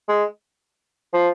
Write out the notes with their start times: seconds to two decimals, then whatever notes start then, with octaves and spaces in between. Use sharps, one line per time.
0.09 G#3
1.14 F3